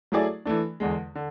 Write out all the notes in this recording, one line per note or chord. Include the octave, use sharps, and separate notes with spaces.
F#3 A3 E4 G#4 D5
E3 A3 D4
E2 D3 G#3
D3